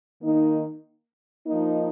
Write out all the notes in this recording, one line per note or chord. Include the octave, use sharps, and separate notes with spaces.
D#3 A#3 D#4
F3 A#3 D#4